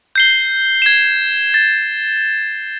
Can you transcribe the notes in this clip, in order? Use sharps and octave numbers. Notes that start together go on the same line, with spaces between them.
G6 C7 G7
G#6 E7
A6